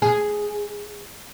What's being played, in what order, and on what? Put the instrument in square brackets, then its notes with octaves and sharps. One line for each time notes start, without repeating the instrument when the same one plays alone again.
[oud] G#4